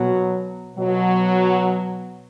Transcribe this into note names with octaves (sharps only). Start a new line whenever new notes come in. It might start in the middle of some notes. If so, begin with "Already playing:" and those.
Already playing: B2 F#3
B2 F#3